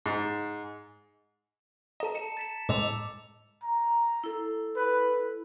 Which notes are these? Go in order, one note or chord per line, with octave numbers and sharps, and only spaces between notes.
G#2
A4 D#5 A5 A#5
A5 C#7 E7
A6 B6 E7
A2 G#3 D6 E6 F7
A#5
E4 A4
B4